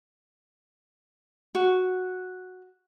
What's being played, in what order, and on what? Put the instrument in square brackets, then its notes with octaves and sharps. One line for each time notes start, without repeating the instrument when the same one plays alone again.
[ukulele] F#4